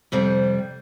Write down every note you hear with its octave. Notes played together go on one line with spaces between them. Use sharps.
F2 C3 G3